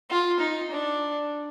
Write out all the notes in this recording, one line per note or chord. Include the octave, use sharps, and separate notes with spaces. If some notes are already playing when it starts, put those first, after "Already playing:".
F4
D#4
D4